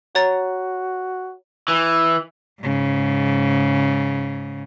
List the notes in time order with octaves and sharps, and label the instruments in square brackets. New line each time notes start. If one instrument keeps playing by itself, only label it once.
[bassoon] F#4 [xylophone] C#5 A#5 A6
[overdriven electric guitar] E3
[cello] G#2 C#3